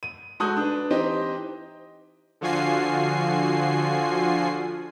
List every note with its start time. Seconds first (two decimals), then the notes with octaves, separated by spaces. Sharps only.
0.03 D#7
0.40 G#3 F#4 A4 D#6 F#6 G6
0.57 D4 B4
0.91 E3 C4 D#4 G4 D#5
2.41 D3 F3 F4 F#4 G#5 C7